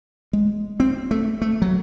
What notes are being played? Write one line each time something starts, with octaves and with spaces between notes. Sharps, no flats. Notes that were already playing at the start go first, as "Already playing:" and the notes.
G#3
C4
A3
A3
F#3